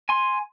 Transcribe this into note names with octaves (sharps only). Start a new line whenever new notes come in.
G#5 C6